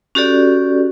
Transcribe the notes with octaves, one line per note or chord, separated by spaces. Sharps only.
C#4 F#4 G4 A4 D5